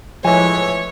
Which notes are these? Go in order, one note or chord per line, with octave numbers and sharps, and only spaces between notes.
A2 E3 F3 G#3 C#5 G#5